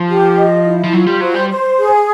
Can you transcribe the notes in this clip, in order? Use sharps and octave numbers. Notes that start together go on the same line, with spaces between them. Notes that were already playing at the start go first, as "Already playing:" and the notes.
Already playing: F3
G4
D#5
E4
F3
F#3 F4
G3
F#3 C5
G3
C5
G#4